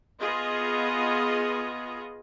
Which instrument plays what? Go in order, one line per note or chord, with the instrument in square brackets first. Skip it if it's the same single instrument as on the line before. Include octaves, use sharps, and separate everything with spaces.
[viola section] B3 F4 G#4 D#5